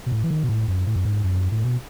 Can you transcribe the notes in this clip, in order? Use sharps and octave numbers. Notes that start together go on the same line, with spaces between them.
B2
A2
E3
D#3
B2
A2
F#2
A2
F#2
G#2
F#2
A2
B2